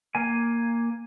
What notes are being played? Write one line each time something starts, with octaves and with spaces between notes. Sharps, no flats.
A#3 G#5